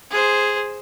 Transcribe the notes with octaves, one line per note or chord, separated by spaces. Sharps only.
G#4 C5